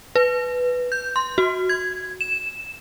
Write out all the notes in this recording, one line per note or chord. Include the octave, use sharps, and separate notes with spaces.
B4
G6
C6
F#4
G#6
E7